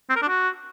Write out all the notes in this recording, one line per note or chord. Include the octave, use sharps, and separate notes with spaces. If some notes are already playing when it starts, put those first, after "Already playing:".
C4
A#4
D4
F#4